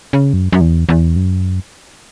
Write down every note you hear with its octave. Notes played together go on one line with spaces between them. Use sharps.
C#3
F#2
F#2
E2
E2
F#2